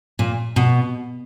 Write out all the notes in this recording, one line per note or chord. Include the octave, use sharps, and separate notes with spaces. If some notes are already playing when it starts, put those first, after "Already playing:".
A#2
B2